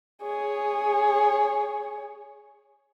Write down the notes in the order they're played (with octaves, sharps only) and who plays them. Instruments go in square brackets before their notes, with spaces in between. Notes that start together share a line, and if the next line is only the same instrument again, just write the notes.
[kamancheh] G#4 C#5